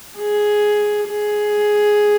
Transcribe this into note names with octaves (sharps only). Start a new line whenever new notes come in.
G#4
G#4